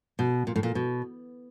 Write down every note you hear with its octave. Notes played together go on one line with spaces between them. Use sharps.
B2
A#2
A2
A#2
B2